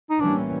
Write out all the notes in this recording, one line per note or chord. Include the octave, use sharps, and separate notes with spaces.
D#4
A2 E3 G3 A#3 C#4 D4